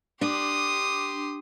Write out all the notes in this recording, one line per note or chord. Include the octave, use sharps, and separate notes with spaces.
D4 G4 C6 D#6